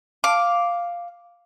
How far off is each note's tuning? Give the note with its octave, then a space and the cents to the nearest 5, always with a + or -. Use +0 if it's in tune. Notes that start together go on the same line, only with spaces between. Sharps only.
F5 +0 D6 -5